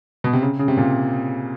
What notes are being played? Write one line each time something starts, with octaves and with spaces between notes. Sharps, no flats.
B2
C3
C#3
C#3
C3
A#2